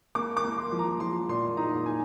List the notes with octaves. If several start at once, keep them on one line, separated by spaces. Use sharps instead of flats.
A#3 D6
D6
A#3
C6
F3
A#5
F3 C6
A#2 C6
D#4 A#5
D#4 G#5